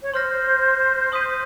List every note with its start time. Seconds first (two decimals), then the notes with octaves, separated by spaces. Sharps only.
0.03 C#5
0.13 C5 C6 F6 A#6
1.12 C6 D#6 G6 B6 D#7